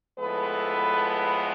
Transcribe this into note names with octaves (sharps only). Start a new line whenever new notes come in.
A2 F3 G#3 B3 A4 B4